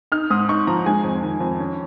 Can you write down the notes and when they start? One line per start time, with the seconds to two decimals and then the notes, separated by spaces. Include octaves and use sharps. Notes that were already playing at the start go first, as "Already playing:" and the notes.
0.12 D#4 F6
0.30 G#2 D#6
0.49 D#4 C#6
0.67 F3 A#5
0.86 G#3 G#5
1.04 F2
1.22 D#3
1.41 F2
1.59 C#4